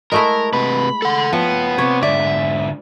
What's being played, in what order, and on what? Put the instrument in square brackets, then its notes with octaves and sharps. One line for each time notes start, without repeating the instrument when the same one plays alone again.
[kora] G#3 A3 E4 [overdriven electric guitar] A#4
[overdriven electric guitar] C3 B4 [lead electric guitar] B5
[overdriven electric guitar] A4 F#5
[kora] F3 [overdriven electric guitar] B3 [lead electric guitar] C#5 G5
[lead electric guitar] C3 [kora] C#5
[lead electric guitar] G#2 D3 [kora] D5 [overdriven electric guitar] E5